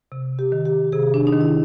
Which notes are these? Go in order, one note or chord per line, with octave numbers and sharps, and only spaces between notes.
C3
G4
D#3
G4
C3 G#4
D4
D#4
D#3
E4